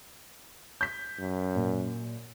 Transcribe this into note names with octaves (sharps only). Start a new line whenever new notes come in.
G6 B6
F#2
A#2